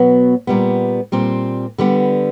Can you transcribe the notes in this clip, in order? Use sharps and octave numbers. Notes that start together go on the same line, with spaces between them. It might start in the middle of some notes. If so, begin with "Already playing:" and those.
Already playing: B2 F#3 B3
A#2 G3 B3
A#2 G3 C4
D3 G3 B3